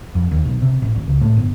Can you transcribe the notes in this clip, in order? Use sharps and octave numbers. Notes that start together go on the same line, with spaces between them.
F2
D#2
B1
C3
A1
G#1
C#2
A2
G1